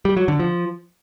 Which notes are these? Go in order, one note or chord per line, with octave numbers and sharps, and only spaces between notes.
G3
F#3
D3
F3